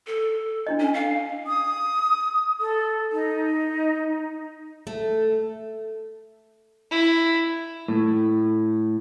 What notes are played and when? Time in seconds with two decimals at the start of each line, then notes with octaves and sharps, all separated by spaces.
0.07 A4
0.67 D4 E4 D#5
0.80 C#4
0.94 F5
1.47 D#6
2.60 A4
3.12 D#4
4.87 A3
6.91 E4
7.88 A2